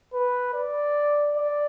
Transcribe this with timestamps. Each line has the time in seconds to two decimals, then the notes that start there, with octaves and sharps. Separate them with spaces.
0.13 B4
0.54 D5
1.36 D5